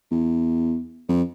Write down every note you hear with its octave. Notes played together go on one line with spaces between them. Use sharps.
E2
F2